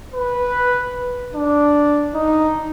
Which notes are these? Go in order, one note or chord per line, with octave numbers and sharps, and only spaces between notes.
B4
D4
D#4